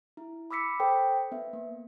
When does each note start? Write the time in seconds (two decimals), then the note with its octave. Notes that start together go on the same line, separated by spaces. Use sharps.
0.17 E4
0.51 B5 D6 E6 B6 C#7
0.80 A4 C5 G5
1.32 B3 E5
1.53 A#3